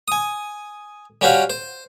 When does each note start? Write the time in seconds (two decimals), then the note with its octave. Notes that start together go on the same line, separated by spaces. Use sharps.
0.08 G#5 D#6
1.21 G3 C#4 F#4 G4 C5 F5
1.50 C5